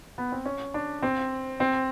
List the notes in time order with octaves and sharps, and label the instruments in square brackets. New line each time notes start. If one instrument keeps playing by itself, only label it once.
[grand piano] B3
C4
C#4
D4
C4
C4